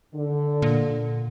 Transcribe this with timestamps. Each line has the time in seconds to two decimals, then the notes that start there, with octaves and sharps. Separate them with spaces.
0.14 D3
0.62 A#2